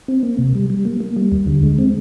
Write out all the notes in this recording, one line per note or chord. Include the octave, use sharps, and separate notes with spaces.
C4
A#3
C3
G3
G3
A#3
A#3
G3
D#2
D3
G#3
C4